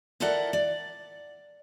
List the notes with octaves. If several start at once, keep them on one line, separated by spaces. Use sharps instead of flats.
E4 F4 A4 A#4 D5 F#5
D5